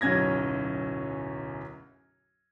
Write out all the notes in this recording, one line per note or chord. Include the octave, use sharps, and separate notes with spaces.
D1 B1 F#2 C#4 G#6 A#6